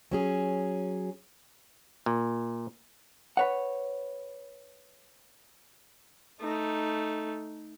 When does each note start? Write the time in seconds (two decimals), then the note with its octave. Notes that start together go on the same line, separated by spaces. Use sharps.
0.11 F#3 C#4 G#4
2.06 A#2
3.37 B4 C#5 F#5
6.41 A3 D#4